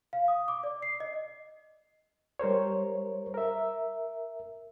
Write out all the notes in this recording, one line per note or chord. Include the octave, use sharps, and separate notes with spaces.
F5
D#6
D6
D5
C7
D#5
G3 A#4 C5 C#5
A#4 E5